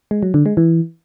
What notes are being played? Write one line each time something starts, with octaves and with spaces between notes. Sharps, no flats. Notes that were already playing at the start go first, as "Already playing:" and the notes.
G#3
F#3
D3
G#3
E3